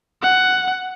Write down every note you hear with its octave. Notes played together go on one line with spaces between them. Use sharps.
F#5